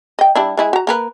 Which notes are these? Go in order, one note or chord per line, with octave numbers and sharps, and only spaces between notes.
D#5 G5
G3 D4 E4
G#3 E4 G#4
F#4 A#5
A#3 A#4 B4